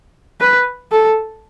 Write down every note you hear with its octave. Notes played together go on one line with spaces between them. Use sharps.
B4
A4